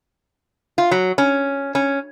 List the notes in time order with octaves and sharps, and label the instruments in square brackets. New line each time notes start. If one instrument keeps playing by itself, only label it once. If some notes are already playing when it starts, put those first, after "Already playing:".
[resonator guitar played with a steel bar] F4
F#3
C#4
C#4